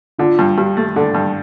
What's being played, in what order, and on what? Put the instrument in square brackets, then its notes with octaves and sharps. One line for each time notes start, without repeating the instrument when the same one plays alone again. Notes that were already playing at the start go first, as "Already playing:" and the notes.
[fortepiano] D3 [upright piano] F4
[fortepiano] G2
[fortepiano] G2 [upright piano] G4
[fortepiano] A3
[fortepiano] D3 [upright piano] A4
[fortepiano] G2